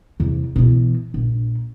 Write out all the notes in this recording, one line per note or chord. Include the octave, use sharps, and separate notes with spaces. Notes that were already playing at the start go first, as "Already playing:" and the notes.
E2 C3
B2 E3
A#1